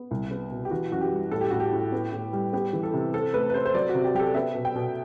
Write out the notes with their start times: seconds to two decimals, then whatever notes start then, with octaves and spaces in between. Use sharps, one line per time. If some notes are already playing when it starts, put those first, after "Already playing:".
Already playing: B3
0.11 C2
0.31 B3
0.51 B2
0.65 G4
0.71 E3 F#4
0.92 F#2 F#4
1.01 G4
1.12 G3
1.31 A2 A4
1.41 G4
1.50 A2 F#4
1.60 G4
1.73 A2
1.92 B3
2.13 A2
2.33 G3
2.53 B3 G4
2.73 E3
2.83 A4
2.93 C3
3.14 C4 A4
3.34 A3 B4
3.50 B4
3.54 C4 C5
3.65 C5
3.74 F#3 D5
3.89 F#4
3.94 C3
4.04 G4
4.14 F#3 G4
4.20 A4
4.34 B3 E5
4.55 B2
4.65 G5
4.75 B2